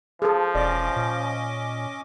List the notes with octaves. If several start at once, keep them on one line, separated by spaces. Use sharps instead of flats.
F3 G#4 A4
E1 C#4 D5 D#5 D6
A#2